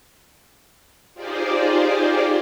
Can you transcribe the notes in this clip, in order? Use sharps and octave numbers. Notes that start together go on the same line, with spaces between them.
D#4 F4 G4 G#4 C5 D5